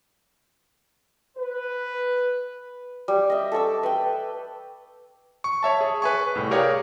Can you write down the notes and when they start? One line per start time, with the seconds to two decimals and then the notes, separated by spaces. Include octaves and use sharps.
1.38 B4
3.08 G3
3.30 D#5 E5
3.52 A4 C#6 D6 E6
3.83 B4 G5
5.44 C#6
5.63 C#5 E5 A5
5.81 G#4
6.02 B4 G#5 C#6
6.35 C2 A2
6.51 G4 G#4 A#4 C#5 D5 F5